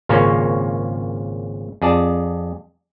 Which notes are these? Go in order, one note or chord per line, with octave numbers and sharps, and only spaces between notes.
G#1 A#2 C#3 A#3 C#4 C#5
F2 G#4 D5 A5